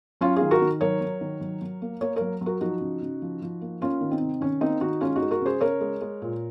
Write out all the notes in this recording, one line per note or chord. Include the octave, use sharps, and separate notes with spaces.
F#3 C#4 F4
D#3 F4 G#4
F#4 A#4
D#3
F#3 A#4 C#5
F#3
D#3
F#3
F#3
A#3
A#3 A#4 C#5
F#3 A#4 C#5
F#3
F#4 A#4
F3 D#4 F#4
C#3
C#3
F3
F3
A#3
A#3 C#4 F4
D#3
C4 D#4
C3
D#3 C#4
A#3 C4 D#4
D#3 D#4 F#4
G#3 C#4 F4
D#4 F#4
G#3
F#4 A#4
C#3 G#4 C5
C#3 A#4 C#5
G#3
G#3
A#2